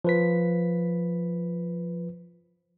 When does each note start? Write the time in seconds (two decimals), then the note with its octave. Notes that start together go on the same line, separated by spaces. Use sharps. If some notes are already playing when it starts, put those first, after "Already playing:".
0.04 F3 B4 B6